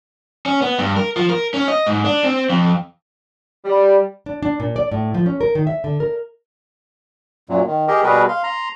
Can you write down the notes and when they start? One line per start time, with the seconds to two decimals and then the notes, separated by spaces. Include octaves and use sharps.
0.46 C#4
0.62 B3
0.79 G2
0.96 A#4
1.17 F3
1.30 A#4
1.54 C#4
1.68 D#5
1.86 G#2
2.05 D4
2.24 C4
2.50 F2
3.65 G3
4.26 D4
4.43 D4
4.60 A#2
4.76 D5
4.92 A2
5.14 F3
5.26 C#4
5.41 A#4
5.55 D#3
5.67 E5
5.84 D3
6.00 A#4
7.49 F#2 A#2 F#3
7.67 D#3
7.88 G4 G#4 A#4 D#5
8.04 B2 G3 F#4 G#4 A#4 B4
8.29 F5 C6
8.44 A#5 C6